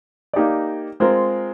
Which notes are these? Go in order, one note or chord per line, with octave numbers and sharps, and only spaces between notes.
A#3 D#4 G4 D5
G#3 C4 F4 A#4